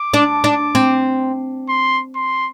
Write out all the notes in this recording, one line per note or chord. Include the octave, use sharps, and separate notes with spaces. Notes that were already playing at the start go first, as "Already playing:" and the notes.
Already playing: D6
D4
D4
C4
C6
C6